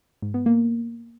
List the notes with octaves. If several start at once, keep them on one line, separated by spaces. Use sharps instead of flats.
G#2
B3
A#3